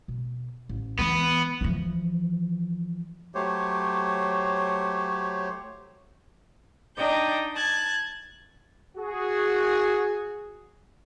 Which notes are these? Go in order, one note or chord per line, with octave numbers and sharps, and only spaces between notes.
B2
A1
E3 G#3 B3
E3 F3
F#3 A3 G4 C5 C#5
D4 D#4 D5 D#5 G5 G6
A5 F#6 G#6
F#4 G#4